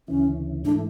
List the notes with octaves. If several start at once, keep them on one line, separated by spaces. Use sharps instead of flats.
D2 C#3 E3 C#4
G#2 E3 A3 D4